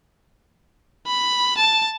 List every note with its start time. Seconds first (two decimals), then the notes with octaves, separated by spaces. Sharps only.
1.07 B5
1.57 A5